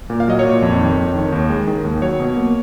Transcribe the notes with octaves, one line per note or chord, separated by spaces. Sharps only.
A#2
F5
F#3 D#5
C#5
A#2
F2
D#3
F2
D#3
D#2
G#3
D#3
D#2
F#3 C#5
B2
A#3